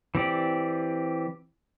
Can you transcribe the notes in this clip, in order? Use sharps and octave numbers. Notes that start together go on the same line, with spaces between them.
E3 C4 G4 D5